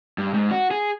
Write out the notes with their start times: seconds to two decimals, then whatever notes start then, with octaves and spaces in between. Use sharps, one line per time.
0.18 G2
0.34 G#2
0.51 F#4
0.71 G#4